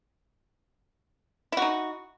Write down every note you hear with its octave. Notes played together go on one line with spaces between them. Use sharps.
D#4 E4 F#4